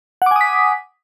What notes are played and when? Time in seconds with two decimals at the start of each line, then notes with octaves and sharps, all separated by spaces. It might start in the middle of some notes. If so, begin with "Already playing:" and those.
0.22 F#5
0.26 D6
0.31 G#5
0.36 D#6
0.41 B6